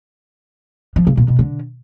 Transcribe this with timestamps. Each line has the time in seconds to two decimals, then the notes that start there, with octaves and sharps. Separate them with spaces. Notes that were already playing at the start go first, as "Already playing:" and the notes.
0.96 F3
1.07 C#3
1.17 A#2
1.28 B2
1.39 D3